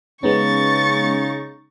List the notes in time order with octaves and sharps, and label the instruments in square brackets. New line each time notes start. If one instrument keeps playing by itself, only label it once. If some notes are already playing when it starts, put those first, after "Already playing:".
[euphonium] C#3 [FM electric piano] G#3 B3 C#4 [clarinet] D#4 [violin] C#6 A6